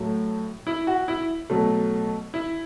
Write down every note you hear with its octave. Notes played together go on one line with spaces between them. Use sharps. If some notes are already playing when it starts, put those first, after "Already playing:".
Already playing: A2 F#3 A3
E4
F#4
E4
B2 F#3 A3
E4